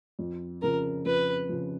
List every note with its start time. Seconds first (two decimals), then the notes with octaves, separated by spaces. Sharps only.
0.19 F2
0.62 C#3 F3 A#4
1.05 F2 B4
1.49 C#3 F3